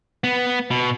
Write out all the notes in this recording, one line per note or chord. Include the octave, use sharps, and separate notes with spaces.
B3
B2